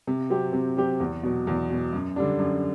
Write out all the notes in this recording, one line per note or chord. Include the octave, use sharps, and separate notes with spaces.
C3
F#3 C4 G4
C3
F#3 C4 G4
E2
B2 F#3
E2
B2 F#3
F#2
D3 G3 D4
F#2